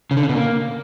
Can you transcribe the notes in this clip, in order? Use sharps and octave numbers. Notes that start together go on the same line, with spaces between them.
C#3
D3
C#3
B2
A#3